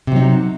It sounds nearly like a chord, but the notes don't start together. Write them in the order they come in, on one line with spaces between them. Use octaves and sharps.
C3 F#3 D#4